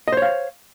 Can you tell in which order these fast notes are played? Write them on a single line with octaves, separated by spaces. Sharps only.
D#5 C5 C#5 F5